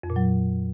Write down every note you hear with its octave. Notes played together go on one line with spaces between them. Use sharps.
F2
A#2
F#3